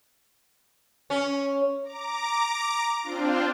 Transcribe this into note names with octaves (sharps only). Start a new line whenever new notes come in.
C#4
A#5 D6
C4 D4 F4